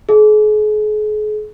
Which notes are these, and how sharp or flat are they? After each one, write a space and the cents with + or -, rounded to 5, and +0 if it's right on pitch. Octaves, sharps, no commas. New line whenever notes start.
G#4 +40